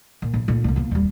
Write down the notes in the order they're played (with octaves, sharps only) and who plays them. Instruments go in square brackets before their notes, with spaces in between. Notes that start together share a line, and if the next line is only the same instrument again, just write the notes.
[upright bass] A#2
A#1
A#2 A3
C2 A3
A#3 B3
D#1 G3